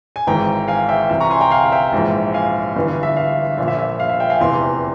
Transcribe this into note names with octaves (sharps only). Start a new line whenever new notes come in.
G#5
G#1 G#2 E3 G5 A#5
F5 G#5
E5 G5
C2 C3 E3 E5
A#5 C#6
G#5 C6
G5 A#5
F5 G#5
F5
E5 G5
A#1 G#2 E3
F5 G#5
G1 G2 E3
E5
F5
A#1 A#2 E5
E5
E5
E5
F5
E5
E5 G5
F5 G#5
F1 E2 C3 E3 G#5 C6